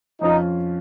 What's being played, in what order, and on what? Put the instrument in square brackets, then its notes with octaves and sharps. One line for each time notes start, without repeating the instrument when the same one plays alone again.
[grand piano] F2 F3 C#4 F4 [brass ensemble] D#4